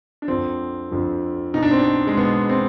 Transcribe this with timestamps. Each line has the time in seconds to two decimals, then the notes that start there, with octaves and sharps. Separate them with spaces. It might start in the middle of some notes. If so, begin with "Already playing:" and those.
0.22 D4
0.28 F2 D3 F3 C4
0.91 F2 D3 F3
1.54 B2 D#4
1.62 D4
1.71 C4
1.79 D4
2.07 G#3
2.17 B2 B3
2.49 C4